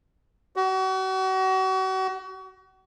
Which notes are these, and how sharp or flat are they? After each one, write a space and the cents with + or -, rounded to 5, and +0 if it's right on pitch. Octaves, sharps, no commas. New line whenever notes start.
F#4 +35